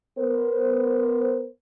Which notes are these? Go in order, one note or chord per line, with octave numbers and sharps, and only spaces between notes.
B3 A#4 C5